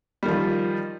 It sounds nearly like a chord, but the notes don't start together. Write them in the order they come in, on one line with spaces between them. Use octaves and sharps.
G3 D#3 F3 F4